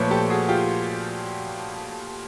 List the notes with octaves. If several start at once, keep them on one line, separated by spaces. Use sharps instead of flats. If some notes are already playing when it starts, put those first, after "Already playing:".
Already playing: A#2 F3 A3 B4 C#5
G4 A4
F#4 G#4
F4 G4